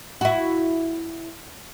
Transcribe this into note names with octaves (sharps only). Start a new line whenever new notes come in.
E4 F#4